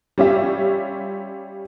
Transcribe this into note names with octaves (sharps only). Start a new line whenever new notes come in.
G3 C#4 F4 G4 E5